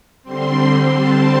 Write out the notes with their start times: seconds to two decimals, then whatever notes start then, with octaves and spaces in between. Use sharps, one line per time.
0.23 D3 G3 C4 C6
0.95 A5